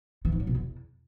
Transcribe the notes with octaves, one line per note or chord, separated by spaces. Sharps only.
E3
G#2
F#3
B2
E2